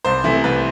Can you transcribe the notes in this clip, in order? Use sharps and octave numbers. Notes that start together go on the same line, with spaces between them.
C2 C5
C3 E3 A3
C2 B4